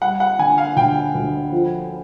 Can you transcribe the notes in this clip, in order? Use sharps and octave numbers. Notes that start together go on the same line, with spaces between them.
G3 F#5
F#5
D3 G#5
F5
D2 G5
D2
F3